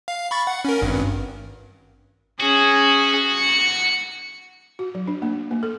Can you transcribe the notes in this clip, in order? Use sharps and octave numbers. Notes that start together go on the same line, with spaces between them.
F5
B5 C#6 A6
F#5
C#4 A#4
G#1 G2
C#4 F#4 G#4
C#7
F#4
F#3
D4
A#3
A#3
A4